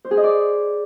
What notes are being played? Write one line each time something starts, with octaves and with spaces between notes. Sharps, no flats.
C5
G#4
D#5
D5